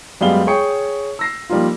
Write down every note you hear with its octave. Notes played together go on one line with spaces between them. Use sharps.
F#2 G3 G#3 B3 F5 G7
G#4 C#5 G5 C#6 C#7
E6 A#6 C7
F3 G3 A#3 D#4 F4